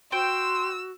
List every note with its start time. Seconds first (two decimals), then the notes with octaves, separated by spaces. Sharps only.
0.12 F#4 C5 G5 C6 E6